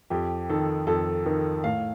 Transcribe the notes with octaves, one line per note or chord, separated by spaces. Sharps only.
F2 G4
D#3 A4
F2 A4
D#3 A#4
A2 F5